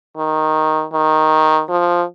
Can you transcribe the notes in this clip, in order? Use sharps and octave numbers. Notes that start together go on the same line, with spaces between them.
D#3
D#3
F3